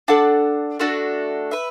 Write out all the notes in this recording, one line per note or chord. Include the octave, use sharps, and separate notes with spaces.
D4 A4 F#5 A5
A3 D4 F#4 A4
B4 E5